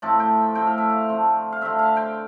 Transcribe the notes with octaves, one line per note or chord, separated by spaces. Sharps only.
A2 F3 A3 C4 A5
G5
A2 F3 A3 C4 G5
F5
E5
F5
D3 F3 A3 C4
F5
D3 F3 A3 C4 E5
F5
G5